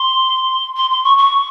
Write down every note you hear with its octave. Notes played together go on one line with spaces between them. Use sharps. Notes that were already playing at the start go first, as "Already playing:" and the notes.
Already playing: C6
C6
C6
C#6
C#6